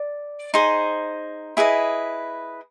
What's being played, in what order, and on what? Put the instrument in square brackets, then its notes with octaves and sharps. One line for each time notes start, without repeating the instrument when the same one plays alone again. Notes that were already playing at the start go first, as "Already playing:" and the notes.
Already playing: [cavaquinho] D5
D#4 G#4 C5
E4 G#4 B4 D#5